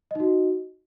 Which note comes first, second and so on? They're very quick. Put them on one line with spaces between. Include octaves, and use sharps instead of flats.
D#5 D#4 F#4